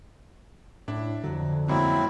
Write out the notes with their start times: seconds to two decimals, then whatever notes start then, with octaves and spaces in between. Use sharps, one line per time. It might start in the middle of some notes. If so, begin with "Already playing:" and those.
0.88 A2 D4 E4
1.24 F2 D3 F#3
1.68 G#2 B2 F#3 A#3 C4 E4